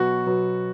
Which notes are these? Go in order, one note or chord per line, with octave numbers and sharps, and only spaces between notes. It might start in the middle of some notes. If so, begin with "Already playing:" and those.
Already playing: B2 F#3 B3 F#4
B2 F#3 B3